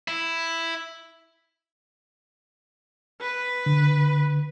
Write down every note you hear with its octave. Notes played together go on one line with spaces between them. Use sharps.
E4
B4
D3